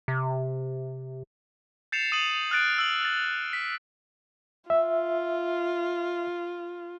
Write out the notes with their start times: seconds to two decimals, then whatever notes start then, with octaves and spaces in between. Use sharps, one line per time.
0.08 C3
1.92 G6 A6 C7 C#7 E7 F7
2.12 D#6 D#7 F#7
2.51 F6 F#6 A6 D7
2.78 E6 F#7
3.01 F6 A6
3.53 B6
4.70 F4 E5